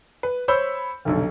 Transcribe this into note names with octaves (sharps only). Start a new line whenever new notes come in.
B4
C5 C#5 B5 E6 G6
F1 B1 D3